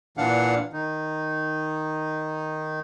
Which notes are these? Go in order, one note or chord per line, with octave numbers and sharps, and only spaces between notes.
A#2 E3 D4 F5 F#5
D#3 D#4